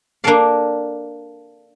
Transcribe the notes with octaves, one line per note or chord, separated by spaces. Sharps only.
A#3 D4 A4 D5 F5